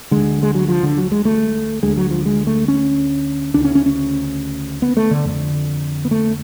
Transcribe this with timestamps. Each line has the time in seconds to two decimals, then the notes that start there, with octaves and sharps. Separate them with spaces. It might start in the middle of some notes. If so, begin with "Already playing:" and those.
0.11 D2 D3 G#3
0.43 G#3
0.55 F#3
0.68 F3
0.83 D3
0.98 F#3
1.12 G#3
1.25 A3
1.83 D2 D3 G#3
1.97 F#3
2.11 F3
2.26 G#3
2.47 A3
2.68 C#4
3.54 D2 C#3 D4
3.65 C#4
3.75 C#4
3.86 C#4
4.82 B3
4.97 A3
5.11 D3
5.25 F2 D3
6.05 B3
6.11 A3